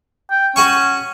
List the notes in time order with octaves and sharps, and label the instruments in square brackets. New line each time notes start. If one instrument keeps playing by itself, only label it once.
[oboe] G5
[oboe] C#4 [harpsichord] F#4 G#5 C#6